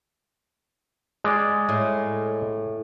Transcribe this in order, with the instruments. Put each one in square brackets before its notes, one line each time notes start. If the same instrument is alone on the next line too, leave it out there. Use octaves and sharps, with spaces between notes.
[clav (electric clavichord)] G#3 D5
[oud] A2